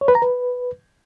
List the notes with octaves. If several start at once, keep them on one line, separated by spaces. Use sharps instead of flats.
C#5
B4
A#5
B4